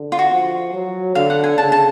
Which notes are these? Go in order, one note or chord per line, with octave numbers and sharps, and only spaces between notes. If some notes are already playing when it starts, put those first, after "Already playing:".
Already playing: D3
F4
F#4
F3
F#3
D3 F5
F#5
G#5
C#3 A5
A5